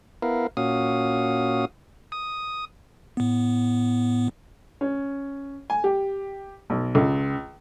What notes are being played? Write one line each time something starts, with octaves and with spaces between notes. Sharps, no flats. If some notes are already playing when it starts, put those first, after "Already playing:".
B3 E4 A#4 F5
A#2 C#4 F#4 F5 D#6
D#6
A2 B3
C#4
G#5
G4
B1
C#2